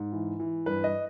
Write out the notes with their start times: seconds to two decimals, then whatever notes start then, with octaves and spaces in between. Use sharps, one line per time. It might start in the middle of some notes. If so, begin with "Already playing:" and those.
Already playing: G#2
0.12 E3
0.39 E3
0.66 G2 B4
0.84 D#5